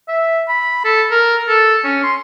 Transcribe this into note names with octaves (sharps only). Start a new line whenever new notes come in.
E5
B5
A4
A#4
A4
C#4
C6